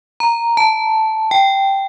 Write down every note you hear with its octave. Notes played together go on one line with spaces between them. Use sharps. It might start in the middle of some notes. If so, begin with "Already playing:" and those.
A#5
A5
G5